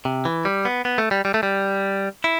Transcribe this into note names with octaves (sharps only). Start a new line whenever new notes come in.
C3
E3
G3
B3
B3
A3
G3
G3
A3
G3
E4